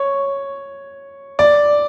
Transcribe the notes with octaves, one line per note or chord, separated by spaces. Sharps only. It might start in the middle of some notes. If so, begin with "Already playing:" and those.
Already playing: C#5
D5